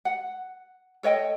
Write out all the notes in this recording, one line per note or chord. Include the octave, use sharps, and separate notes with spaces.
F#5
A4 C#5 D#5 G5